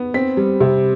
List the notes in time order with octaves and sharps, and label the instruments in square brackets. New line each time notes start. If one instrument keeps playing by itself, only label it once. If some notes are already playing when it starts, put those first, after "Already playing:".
Already playing: [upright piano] B3
C4 B6
G3
C3